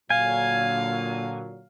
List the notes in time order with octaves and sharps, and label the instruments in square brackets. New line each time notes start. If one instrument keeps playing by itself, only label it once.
[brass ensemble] A#2 D3 F#3 [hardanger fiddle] F5 [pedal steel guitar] G#5